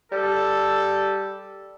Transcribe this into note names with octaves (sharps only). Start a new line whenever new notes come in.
G3 A4